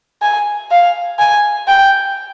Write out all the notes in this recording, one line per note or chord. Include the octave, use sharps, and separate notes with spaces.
G#5
F5
G#5
G5